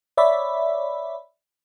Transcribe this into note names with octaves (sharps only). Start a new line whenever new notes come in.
C#5 D5 E5 B5